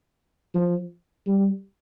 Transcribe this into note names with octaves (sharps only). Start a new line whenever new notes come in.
F3
G3